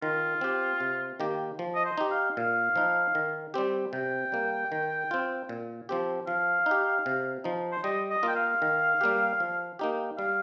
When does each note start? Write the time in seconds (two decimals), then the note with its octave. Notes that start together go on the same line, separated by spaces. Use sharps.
0.02 D#3 F4
0.41 C4 G4
0.80 C3
1.20 D#3 A#3 G4
1.59 F3
1.75 D#5
1.85 C5
1.98 D#4 G4
2.11 F5
2.37 A#2 F5
2.76 F3 D#4
3.15 D#3
3.54 G3 C4 G4
3.93 C3 G5
4.32 G3 A#3
4.72 D#3
5.11 C4 F4
5.49 A#2
5.89 F3 C4 G4
6.27 F3 F5
6.66 D#4
6.71 G4
7.06 C3
7.44 F3 D#4
7.72 C5
7.84 G3 D#5
8.10 D#5
8.23 A#3 F4 G5
8.36 F5
8.62 D#3
9.01 G3 A#3 G4
9.40 F3
9.79 A#3 D#4 G4
10.18 G3 F5